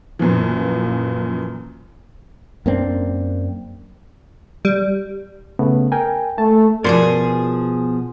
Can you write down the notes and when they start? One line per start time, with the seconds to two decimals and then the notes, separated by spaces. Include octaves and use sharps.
0.19 F#2 A#2 E3 F3
2.66 F#2 A#3 C4 D4
4.65 G3
5.59 C#3 A3 B3
5.92 A#4 G5 G#5
6.38 A3 A5
6.84 B2 F3 G#4 A#4 D5 C6